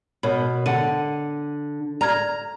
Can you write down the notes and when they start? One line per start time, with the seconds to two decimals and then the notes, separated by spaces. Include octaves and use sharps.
0.23 B2 A#4 C#5 B5
0.66 D3 F#5 D#7
2.01 D5 A#5 F6 G#6